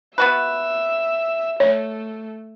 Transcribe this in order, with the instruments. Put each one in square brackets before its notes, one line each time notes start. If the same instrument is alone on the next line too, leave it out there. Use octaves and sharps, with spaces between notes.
[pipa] B3 F#4 B4 [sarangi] E5
[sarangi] A3 [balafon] C#5